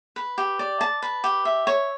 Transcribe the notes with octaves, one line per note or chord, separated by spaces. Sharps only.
B4
G4
D5
A5
B4
G4
E5
C#5